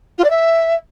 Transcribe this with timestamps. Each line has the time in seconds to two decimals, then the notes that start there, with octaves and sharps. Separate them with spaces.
0.18 F4
0.24 D5
0.30 E5